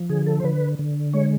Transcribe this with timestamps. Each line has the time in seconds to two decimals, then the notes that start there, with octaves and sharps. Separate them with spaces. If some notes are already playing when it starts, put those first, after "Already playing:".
Already playing: F3
0.09 D3 G#4
0.26 A4
0.40 C5
0.44 D3 B4
0.79 D3
1.14 G#3 C#5